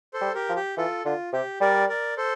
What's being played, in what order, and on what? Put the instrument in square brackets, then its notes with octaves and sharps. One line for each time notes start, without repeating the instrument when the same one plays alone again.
[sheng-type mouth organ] A4 C5
[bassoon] G3
[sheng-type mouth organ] G4 A#4
[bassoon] F3
[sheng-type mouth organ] G4
[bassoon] E3 [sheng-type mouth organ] F4 A4
[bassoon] D3 [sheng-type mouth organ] F4
[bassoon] C3 [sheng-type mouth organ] G4
[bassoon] G3 [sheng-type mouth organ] A#4 D5
[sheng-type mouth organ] A#4 D5
A4 C5